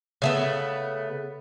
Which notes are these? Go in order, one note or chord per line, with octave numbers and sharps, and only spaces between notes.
C#3 A3 B3